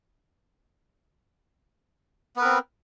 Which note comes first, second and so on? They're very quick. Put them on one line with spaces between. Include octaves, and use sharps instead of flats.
B3 B4 A#4 C4